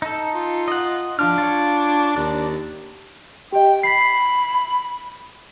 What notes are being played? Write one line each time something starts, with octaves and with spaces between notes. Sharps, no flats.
D#4 A4
F4
D#5 F#5
F3 D4 F4 F6
F4 C#5
D#2 D4
G4 D#5 G5
B5 B6 C7